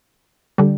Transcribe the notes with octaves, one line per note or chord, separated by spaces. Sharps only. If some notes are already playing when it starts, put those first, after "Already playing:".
D3 G3